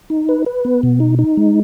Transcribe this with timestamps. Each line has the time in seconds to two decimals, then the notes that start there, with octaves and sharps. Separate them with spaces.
0.10 D#4
0.29 B4
0.46 B4
0.65 B3
0.83 B2
1.00 D#4
1.19 D#4
1.37 G#3